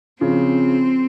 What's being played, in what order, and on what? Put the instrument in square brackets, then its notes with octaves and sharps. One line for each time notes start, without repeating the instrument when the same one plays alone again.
[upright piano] C#3 F3 [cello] C4